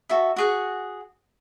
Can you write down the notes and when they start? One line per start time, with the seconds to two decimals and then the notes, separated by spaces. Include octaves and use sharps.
0.09 F#4 A4 E5
0.36 F#4 G#4 F#5